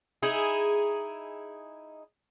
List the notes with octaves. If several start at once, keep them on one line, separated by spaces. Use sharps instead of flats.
D#4 E4 G#4